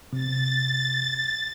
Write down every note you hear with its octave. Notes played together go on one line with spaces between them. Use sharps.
C3 A6